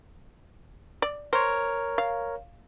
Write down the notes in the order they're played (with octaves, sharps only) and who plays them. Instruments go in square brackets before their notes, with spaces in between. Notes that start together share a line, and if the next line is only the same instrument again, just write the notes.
[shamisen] D5
[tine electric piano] A#4 C#5 [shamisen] C5
[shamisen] F5